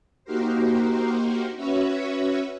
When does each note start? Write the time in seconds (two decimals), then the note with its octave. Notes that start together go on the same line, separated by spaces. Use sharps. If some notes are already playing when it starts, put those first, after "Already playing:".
0.25 A#3 D#4 F#4 G4 A#4 C5
1.56 C#4 F#4 B4 C#5 E5